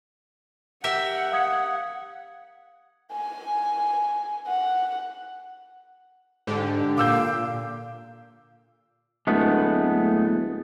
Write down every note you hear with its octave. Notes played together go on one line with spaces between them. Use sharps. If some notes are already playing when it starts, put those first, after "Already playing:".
G4 A#4 E5 F#5
F5 D#6 G#6
G#5
F#5
G#2 D3 G4
A#2 F5 D6 E6 G6
D1 G#3 A3 B3